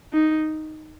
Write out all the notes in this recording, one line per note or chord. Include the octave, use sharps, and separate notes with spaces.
D#4